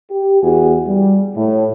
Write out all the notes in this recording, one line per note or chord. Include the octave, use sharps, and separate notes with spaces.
G4
E2 F#4 G#4
G3
A2